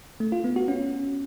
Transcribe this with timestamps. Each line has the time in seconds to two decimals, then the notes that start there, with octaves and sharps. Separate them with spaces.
0.20 A3
0.32 F4
0.44 B3
0.56 F#4
0.68 C#4